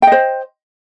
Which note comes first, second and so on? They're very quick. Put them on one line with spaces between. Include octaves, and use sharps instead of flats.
G5 D#5 C5